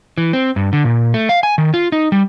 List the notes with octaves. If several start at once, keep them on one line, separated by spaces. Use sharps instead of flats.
E3
C4
G2
D3
A#2
A3
F5
G#5
D#3
F4
D#4
G3